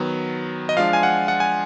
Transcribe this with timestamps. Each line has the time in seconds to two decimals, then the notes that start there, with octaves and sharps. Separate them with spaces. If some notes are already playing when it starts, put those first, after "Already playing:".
Already playing: D#3 F#3 B3
0.69 D#5
0.77 F3 G#3 D4 F4 F5
0.93 G#5
1.03 F#5
1.28 F#5
1.40 G#5